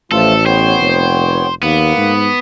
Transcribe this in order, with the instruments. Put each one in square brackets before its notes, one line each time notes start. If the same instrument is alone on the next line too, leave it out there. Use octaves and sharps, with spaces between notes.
[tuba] A1 [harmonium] F3 A3 F4 [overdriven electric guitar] A4
[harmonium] B3 C#5 G5 [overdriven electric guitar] C5
[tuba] F1
[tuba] D#2 [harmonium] A#3 [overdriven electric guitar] B3
[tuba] G#2